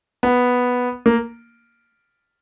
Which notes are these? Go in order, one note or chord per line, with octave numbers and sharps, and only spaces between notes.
B3
A#3